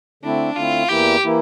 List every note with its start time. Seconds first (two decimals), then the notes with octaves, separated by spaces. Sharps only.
0.23 D3 A3 C4 D4 E4
0.56 D3 A3 C4 E4 F4
0.89 E2 E3 A#3 E4 G4
1.24 E3 A#3 E4